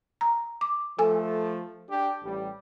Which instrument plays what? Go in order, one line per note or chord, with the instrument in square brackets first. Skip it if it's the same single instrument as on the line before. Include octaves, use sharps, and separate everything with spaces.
[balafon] A#5
D6
[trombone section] F3 A3 [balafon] A4 G#5
[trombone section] D4 G4
A1 G3